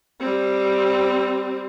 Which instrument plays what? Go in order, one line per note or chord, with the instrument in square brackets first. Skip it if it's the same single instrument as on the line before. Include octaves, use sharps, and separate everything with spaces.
[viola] G3 C4